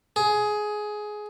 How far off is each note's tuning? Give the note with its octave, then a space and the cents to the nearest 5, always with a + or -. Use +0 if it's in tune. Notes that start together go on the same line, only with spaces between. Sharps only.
G#4 +15